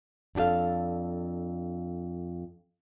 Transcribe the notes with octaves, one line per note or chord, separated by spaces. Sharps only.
F2 D4 G4 A4 F5